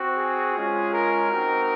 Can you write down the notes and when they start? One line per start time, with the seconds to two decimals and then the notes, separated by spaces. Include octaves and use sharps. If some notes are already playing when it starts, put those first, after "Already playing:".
Already playing: C4 F#4
0.15 G#4
0.54 G#3 C#4 F4
0.92 A#4
1.30 C4 D#4 F#4